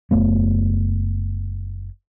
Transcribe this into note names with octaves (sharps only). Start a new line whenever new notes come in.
F#1 A3 B3